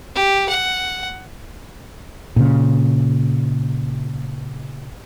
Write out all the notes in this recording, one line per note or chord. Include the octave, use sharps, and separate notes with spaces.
G4
F#5
A#2 C#3